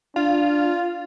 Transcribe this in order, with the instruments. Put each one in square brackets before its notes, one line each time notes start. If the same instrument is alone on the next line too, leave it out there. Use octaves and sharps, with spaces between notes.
[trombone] D4 [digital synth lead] F4